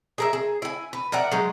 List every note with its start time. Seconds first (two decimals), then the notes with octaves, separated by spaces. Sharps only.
0.18 G#4 A#4 E5
0.33 G#4
0.62 E4 G#5
0.93 B4
1.12 A#4 D5 E5 F#5
1.31 F#3 G#3 D#4